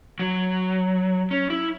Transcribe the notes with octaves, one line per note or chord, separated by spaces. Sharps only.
F#3
C#4
E4